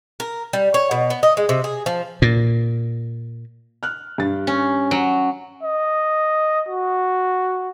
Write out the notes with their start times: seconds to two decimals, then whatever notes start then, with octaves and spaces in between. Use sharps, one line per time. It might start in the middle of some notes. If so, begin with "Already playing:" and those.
0.20 A#4
0.53 G3
0.74 C#5
0.91 B2
1.10 B3
1.23 D#5
1.37 G#3
1.49 C3
1.64 G#4
1.86 F3
2.22 A#2
3.83 F6 F#6
4.18 G2 A6
4.47 C#4
4.91 F#3
5.63 D#5
6.68 F#4